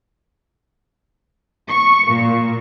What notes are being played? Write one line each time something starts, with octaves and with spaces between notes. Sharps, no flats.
C#6
A#2